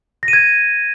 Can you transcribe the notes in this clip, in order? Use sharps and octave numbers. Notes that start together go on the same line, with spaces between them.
A#6
D#7
G#6